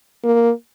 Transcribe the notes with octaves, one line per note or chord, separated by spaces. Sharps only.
A#3